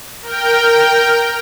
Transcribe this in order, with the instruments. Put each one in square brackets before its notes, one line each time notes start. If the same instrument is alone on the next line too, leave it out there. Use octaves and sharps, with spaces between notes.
[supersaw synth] A#4 G5